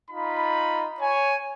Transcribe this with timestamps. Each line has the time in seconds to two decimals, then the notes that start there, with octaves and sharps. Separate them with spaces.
0.10 D#4 F4 B5
1.00 C#5 G#5